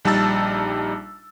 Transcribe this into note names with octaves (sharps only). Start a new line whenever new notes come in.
A#1 G3 D#4 A5 E6 A6